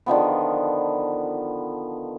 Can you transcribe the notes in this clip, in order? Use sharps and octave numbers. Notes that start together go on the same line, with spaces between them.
D3 D#3 F3 B3